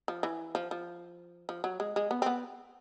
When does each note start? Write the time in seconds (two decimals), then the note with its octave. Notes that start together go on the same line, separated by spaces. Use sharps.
0.08 F3
0.23 E3
0.55 F3
0.71 F3
1.49 F3
1.64 F#3
1.80 G#3
1.96 G#3
2.11 B3
2.22 C4
2.26 B3